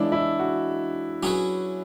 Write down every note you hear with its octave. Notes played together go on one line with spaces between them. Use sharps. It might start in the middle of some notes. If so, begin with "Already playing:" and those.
Already playing: E2 C#3 G#3 D4 E4
E4
F#4
F#3 C#4 G#4 B4